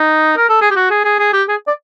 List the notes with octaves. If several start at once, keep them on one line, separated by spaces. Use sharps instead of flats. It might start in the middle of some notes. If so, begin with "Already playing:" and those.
Already playing: D#4
A#4
A4
G#4
G4
F#4
G#4
G#4
G#4
G4
G#4
D5